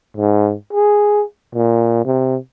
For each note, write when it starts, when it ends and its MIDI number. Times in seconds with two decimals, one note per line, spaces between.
0.17 0.54 44
0.73 1.23 68
1.55 2.00 46
2.05 2.37 48